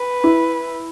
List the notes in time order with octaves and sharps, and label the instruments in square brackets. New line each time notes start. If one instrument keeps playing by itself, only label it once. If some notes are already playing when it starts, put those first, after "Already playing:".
Already playing: [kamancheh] B4
[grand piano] E4